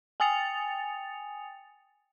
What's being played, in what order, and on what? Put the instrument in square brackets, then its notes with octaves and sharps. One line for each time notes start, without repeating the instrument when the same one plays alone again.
[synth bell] G5 G#5 D#6 A6 C#7 F7